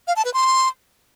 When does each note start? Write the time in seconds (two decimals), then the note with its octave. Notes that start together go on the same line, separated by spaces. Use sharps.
0.07 F5
0.16 A5
0.25 B4
0.34 C6